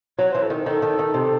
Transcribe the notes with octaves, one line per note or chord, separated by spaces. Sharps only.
F#3 C#5
E3 C5
A4
D#3
D#3 A4
D#3
D#3
C3